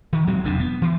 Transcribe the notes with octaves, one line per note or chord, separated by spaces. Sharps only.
D#3
D1 F#3 G#3 C4
E1 E2 C3 D4
B3
E3